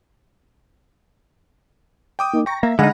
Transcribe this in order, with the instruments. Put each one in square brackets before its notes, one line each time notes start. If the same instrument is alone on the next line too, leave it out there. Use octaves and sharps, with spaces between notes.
[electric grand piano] G5 D6 D#6
[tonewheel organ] A#3 D#4
[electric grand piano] G5 C#6 [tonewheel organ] A#5
[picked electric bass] A#3 [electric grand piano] E5
[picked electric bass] D3 [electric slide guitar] G#3 D#4 [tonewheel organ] F5 [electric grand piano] F#5 B5 A#6